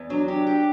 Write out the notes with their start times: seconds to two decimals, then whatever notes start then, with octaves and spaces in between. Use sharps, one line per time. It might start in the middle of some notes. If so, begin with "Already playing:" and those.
Already playing: E2
0.10 F#3 D4
0.27 D4 G4
0.47 G4